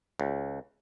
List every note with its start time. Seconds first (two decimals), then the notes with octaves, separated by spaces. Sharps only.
0.20 C#2